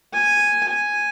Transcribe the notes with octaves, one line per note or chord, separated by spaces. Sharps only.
G#5
G#5